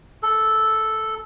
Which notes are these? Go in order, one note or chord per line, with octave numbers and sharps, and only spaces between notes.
A4